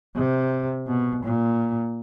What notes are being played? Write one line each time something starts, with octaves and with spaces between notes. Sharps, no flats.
C3
B2
A#2